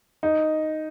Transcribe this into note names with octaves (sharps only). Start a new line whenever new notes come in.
D#4